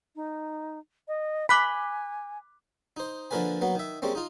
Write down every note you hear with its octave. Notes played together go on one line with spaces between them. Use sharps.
D#4
D#5
G#5 B5 D6 F#6 B6
D#4 C5
D3 F3 A#3 A#4 B4 G#5
F#3 A#3 B3
D#3 E5
G3 G#3 A#3 C4 C#4
D#4 F4